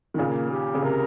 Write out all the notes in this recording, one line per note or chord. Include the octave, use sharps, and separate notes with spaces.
D#3
A#2 C#3 A#3
G4
C#3
C3 A#4